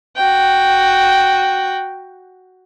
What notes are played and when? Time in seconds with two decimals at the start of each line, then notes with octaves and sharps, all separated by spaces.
0.16 F#4 G5